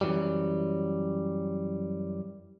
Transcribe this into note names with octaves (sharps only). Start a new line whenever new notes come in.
F#2 A2 E3 F#3 G3